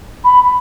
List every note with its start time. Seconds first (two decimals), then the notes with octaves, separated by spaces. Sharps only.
0.24 B5